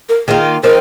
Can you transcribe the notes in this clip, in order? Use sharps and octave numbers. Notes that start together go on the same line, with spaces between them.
A#4
D#3 A#3 F4 G#4
F3 C4 D#4 A#4